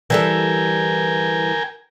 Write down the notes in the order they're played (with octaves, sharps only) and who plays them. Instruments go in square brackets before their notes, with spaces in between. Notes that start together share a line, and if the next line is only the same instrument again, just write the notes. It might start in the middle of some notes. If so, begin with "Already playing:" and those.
[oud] E3 G3 A4 [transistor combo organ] A#4 G5 G#5